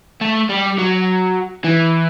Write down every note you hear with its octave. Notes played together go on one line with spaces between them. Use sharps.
A3
G3
F#3
E3